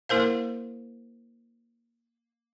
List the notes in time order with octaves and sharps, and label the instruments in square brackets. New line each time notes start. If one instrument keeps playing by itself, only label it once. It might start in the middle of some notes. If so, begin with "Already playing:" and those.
[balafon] A#3 E4 A#4 C5 F5